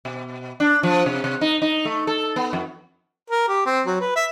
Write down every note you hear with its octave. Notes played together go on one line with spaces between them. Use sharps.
B2
D4
F3
C3
C3
D#4
D#4
A3
A4
B3
F2
A#4
G4
C4
F#3
B4
E5